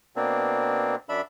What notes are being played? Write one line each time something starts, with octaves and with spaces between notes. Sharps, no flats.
B2 A#3 C4 D4
F#2 D4 E5 B5